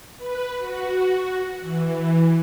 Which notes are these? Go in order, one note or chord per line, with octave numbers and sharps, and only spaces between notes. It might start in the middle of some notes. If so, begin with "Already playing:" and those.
B4
F#4
E3